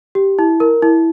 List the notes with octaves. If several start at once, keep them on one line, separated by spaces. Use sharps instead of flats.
G4
E4
A#4
E4